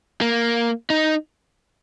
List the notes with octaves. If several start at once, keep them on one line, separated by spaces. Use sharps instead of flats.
A#3
D#4